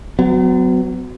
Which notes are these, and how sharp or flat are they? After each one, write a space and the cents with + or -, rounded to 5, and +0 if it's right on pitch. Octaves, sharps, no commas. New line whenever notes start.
F#3 +0 B3 +40